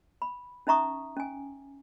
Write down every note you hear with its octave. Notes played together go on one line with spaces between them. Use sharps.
B5
C#4 D#4 E5 A#5 C#6 D#6
C#4 G#5